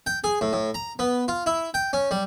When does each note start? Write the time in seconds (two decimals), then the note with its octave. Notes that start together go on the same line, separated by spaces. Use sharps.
0.07 G5
0.24 G#4
0.41 A2
0.53 A2
0.74 A#5
0.99 B3
1.28 F4
1.46 E4
1.74 G5
1.93 C#4
2.11 G3